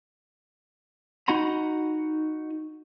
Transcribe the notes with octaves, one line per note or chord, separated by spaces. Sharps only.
D#4 F#4 F#5 A#5 B5